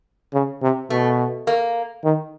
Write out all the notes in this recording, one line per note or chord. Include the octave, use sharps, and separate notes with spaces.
C#3
C3
B2 A3
A#3
D#3